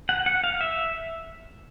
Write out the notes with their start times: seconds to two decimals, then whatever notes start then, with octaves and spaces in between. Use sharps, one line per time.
0.09 F#5
0.26 F#5
0.44 F5
0.61 E5